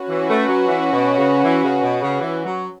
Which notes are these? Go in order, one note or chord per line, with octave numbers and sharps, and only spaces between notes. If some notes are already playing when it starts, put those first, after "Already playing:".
Already playing: C#4 F#4 B4
E3
A3
F#3
E3
B2
C#3
E3
C#3
B2
C#3
E3
F#3